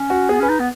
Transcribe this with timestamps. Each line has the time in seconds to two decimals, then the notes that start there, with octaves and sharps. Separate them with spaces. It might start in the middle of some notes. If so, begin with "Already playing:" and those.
Already playing: C#4
0.10 F#4
0.29 B3 G#4
0.39 C#4 B4
0.49 D#4
0.59 B3